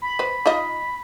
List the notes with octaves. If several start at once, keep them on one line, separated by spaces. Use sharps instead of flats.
B5
B4 C5
D#4 F4 D#5